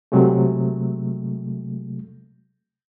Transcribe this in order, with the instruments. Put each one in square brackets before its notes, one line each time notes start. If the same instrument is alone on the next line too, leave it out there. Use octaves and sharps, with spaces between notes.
[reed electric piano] C3 F#3 G#3 A3